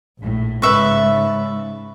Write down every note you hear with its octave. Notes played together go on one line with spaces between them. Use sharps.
A#1 A2
G#2 C#3 B4 E5 C#6